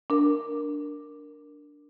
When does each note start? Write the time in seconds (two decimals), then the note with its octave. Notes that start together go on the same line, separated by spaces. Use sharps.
0.10 D4 A#4